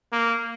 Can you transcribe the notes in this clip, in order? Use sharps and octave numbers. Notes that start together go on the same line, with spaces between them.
A#3